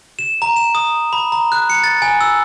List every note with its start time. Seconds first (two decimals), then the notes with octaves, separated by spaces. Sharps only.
0.19 E7
0.42 A#5
0.56 E7
0.75 D#6
1.13 B5
1.32 A#5
1.52 F#6
1.70 C#7
1.84 A6
2.02 G#5
2.21 E6